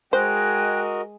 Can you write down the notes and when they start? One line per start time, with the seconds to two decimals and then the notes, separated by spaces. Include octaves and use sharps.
0.13 G#3 F#4 G#4 A#4 C5 D#5 G5 F#6